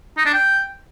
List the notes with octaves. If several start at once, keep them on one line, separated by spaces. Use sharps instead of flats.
D#4
D4
G5